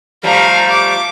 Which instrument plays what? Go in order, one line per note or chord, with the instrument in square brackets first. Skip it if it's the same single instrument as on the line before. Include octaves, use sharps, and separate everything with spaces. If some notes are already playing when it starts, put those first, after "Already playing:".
[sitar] F3 G3 A3 [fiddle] F5 A#5
[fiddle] D6